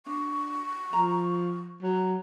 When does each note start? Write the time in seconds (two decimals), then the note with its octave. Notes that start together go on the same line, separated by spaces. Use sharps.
0.06 D4 C#6
0.93 F3 A#5
1.82 F#3